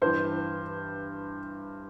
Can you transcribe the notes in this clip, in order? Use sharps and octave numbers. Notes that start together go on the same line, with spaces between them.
G2 E3 C5